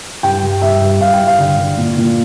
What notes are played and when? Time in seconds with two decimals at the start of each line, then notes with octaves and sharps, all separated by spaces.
0.23 G2 G5
0.43 G2
0.62 G2 E5
0.81 G2
1.00 G2 F5
1.13 G5
1.20 G2
1.27 F5
1.38 D3
1.58 D3
1.77 A#2
1.97 A#2